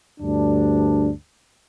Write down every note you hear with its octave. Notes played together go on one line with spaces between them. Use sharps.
D2 G2 D4